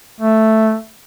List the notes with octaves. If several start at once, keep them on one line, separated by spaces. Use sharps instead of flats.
A3